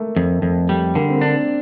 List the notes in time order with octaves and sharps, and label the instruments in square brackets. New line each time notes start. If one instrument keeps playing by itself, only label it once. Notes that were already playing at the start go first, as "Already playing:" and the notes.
Already playing: [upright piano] A3 A#3
[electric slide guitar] F2
F2
G3
[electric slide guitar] D3 [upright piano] A#3
[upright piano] C4
A#3
[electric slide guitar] D4
[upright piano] A#3